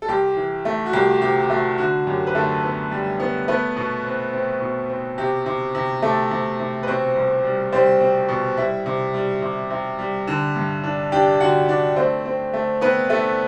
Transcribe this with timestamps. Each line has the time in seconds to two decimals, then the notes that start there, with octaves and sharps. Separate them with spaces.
0.02 A4
0.08 C2 G4
0.36 E3
0.65 A3
0.86 F#4
0.93 C2 G4
1.22 C3 G4
1.50 A3 F#4
1.78 D3 F#4
2.07 F#2 G4
2.27 B4
2.35 D3 A3 A4
2.63 B3
2.91 G3
3.20 B3
3.48 A3 B3 B4
3.77 B2
4.05 C4
4.33 C4
4.61 B2
4.90 C4
5.18 C3 G4
5.46 C3
5.75 C3
6.02 C3 A3 A4
6.31 C3
6.59 C3
6.83 B4
6.87 B2 C4 C5
7.16 C2
7.44 G3
7.73 G3 C4 C5
8.01 C4
8.29 B2
8.57 G3 E4 E5
8.86 C3
9.14 G3
9.42 C3
9.70 C3
9.99 G3
10.27 D3
10.55 G2
10.84 D4
11.12 D4 G4 G5
11.40 D3 F#4 F#5
11.68 D4 D5
11.96 A3 C4 C5
12.25 C4
12.53 A3
12.81 B3 C4 B4
13.10 A3 A4